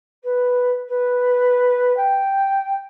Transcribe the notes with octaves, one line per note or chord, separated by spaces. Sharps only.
B4
B4
G5